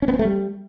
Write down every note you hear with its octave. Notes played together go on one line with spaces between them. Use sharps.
C#4
B3
C4
A3
G3